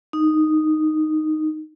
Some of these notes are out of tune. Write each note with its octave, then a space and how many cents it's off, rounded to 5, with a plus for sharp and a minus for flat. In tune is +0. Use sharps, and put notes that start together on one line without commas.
D#4 -5